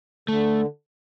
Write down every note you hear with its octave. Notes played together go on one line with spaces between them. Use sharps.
D3 A3